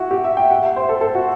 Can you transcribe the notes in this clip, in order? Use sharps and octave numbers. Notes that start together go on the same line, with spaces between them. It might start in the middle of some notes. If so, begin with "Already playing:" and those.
Already playing: E4 F#4
G4
E5
G5
F#5
E5
C5
A4
A4
F#4